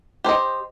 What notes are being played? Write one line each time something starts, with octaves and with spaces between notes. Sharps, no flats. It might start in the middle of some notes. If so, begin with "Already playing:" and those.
G4 C5 D#5